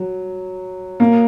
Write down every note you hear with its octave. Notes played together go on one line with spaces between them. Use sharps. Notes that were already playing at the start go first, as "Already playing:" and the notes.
Already playing: F#3
A#3